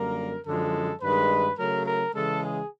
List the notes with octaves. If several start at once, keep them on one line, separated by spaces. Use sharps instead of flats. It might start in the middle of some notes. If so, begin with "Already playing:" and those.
Already playing: F#2 D3 G3 A#3 A#4
F#2 D3 F3 G#3 A4
G2 D#3 G#3 B4
C#3 F#3 A3 A#4
A#4
C#3 E3 G#3 A4
G#4